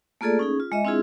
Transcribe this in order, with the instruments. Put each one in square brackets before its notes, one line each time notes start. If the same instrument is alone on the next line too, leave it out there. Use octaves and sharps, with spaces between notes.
[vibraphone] A3 A#3 F4 G#4 A4 D5
C#4 D#4 G#4
F4
G#3 D#5 E5
C4 D4 E4 F4 G#4